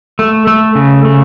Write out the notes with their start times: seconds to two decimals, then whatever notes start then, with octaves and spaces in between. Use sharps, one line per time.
0.19 A3
0.47 A3
0.75 C#3
1.05 A3